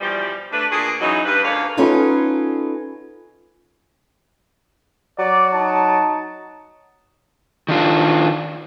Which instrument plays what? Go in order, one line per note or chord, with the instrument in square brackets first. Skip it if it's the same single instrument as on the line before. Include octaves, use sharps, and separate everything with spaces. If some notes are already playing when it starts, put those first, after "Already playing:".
[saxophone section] B2 E3 F3 G3
A3 D4 B4
A#2 D4 F#4 G#4
C#3 E3 F#3 D#4
G2 B4
D2 A#2 A#3 C#4 C#5 F5
[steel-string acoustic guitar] B3 C#4 D#4 F4 G#4 A4
[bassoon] F#3 [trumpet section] D5
[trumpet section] D#4 A5
[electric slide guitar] D#3 D4 F4